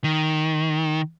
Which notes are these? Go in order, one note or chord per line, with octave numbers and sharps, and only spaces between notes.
D#3